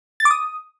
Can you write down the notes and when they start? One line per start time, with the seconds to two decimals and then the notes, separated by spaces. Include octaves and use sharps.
0.20 A6
0.25 D6
0.31 D#6